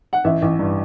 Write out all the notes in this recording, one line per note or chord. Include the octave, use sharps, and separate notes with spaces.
F#5
A1 E5
A1
G2